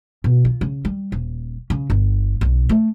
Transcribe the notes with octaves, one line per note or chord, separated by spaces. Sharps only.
B2
F4
C#3
G3
D#1
C#3
G1
B1
A3